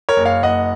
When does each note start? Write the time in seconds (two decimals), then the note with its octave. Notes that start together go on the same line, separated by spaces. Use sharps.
0.09 A#4 C#5
0.17 F#1
0.25 C#5 F5
0.43 F#1 D#5 F#5